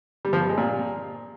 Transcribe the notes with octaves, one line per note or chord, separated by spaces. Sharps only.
G3
F3
G3
G#3
A#2